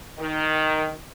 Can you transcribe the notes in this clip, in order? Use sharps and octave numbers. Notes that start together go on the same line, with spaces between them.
D#3